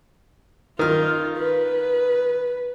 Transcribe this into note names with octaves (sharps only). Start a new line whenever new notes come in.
D#3 F4 F6
B4